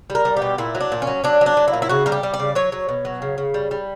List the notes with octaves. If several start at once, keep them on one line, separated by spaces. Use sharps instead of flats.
G3
A#4
G3
G4
B2
A#2 E4
F#3
D4
A#2
C#4
F#3
F#3 D4
F#3
D4
F#3
E4
A#2
E4
C#3 F#4
G3 A#4
G4
G3
D5
C#3
F#3 C#5
F#3
B2
F#3
C#3
C#3
G3
G3